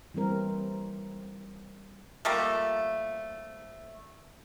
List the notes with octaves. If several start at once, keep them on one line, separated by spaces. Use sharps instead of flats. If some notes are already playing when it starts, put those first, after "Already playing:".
E3 G3 C4 A#4
F3 G3 A3 A#3